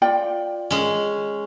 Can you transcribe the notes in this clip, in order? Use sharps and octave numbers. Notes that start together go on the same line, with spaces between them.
F4 D5 G5
G#3 C#4